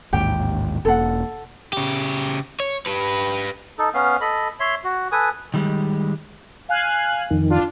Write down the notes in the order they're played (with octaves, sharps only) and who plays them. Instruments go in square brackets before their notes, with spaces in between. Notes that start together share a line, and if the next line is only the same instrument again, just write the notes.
[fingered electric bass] A1 D#2 G#2 [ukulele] G4 G5
[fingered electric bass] E1 A#3 [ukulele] A4 F#5
[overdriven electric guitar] C#3 G4
C#5
G4 B4
[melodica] D#4 A4
B3 C#4 F5
A4 D#5 B5
C#5 E5 C6
F#4
A4 B4 G#5 D#6
[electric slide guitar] D#3 G3 G#3
[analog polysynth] F5 G#5 F#6
[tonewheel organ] F2 D#3
[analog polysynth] D4 F4